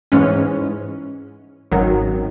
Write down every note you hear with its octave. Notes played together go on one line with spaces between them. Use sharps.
G#2 E3 G#3 C#4
G#1 F#2 D#3 F#3